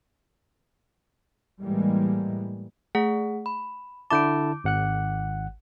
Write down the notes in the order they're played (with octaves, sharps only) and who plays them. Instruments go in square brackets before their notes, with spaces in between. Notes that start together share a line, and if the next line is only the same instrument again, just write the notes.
[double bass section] A2 E3 G3 G#3 A#3
[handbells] A3 G#4 F#5
B5
[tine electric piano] D3 E4 A5 [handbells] D6 G6 D7
[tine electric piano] G#1 F#5 F#6